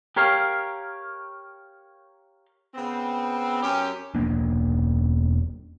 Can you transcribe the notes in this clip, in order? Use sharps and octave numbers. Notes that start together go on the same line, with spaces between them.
G4 A#4 C#5 F5
C#3 B3 C4
F#2 C#4 G4
E1 A#3 D4